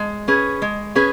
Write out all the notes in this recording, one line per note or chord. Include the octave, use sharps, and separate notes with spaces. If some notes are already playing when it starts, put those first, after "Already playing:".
Already playing: G#3
C#4 G#4 B4
G#3
C#4 G#4 B4